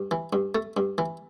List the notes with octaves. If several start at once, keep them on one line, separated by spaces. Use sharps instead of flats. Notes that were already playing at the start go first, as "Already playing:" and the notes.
Already playing: G2
E3
G2
A3
G2
E3